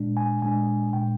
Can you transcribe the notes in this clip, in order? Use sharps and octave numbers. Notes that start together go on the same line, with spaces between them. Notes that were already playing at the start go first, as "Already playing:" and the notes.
Already playing: A#2 G#3 D4
G#5
A#2 G#3 D4 G#5
A#2 G#3 D4 G5